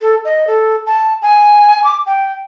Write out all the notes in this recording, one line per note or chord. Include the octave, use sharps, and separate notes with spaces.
A4
D#5
A4
A5
G#5
D6
G5